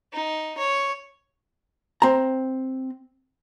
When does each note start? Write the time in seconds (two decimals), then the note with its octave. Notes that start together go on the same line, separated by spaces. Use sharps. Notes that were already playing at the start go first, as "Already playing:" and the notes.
0.13 D#4
0.58 C#5
2.02 C4 A#5